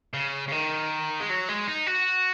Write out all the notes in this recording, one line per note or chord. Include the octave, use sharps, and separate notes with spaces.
C#3
C#3
D#3
G#3
F#3
G#3
D#4
F#4